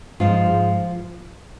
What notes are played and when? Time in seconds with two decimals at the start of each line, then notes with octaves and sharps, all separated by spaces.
0.20 G#2 F3 F4
0.46 G#2